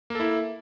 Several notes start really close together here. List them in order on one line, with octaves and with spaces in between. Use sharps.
A#3 A4 E4